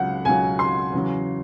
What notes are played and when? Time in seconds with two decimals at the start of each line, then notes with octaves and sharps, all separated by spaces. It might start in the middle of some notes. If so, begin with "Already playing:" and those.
Already playing: C#2 C#3 F#3 F#5
0.25 C#2 C#3 F#3 G#5
0.59 C6
0.93 E2 C#3 F#3